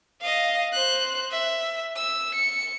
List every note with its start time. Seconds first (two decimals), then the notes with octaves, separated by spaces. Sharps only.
0.21 D#5 F5
0.73 C5 F#6
1.31 E5
1.97 E6
2.35 C#7